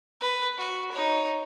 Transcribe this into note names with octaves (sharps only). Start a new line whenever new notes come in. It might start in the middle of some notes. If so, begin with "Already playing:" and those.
B4
F#4
D#4 C#5